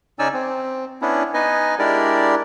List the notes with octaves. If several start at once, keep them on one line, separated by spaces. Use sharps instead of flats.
C#3 C#4 D#4 D5 G#5 E6
C4
B3 C#4 D4 E4
B3 D#4 B4 D#5 G#5
G#3 D4 E4 G4 A#4 D5